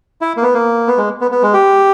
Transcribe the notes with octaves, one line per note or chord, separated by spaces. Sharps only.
E4
A#3
B3
A#3
B3
G#3
B3
B3
G#3
G4